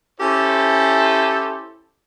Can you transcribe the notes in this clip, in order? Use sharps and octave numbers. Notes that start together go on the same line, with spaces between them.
C#4 E4 G4 A4 C5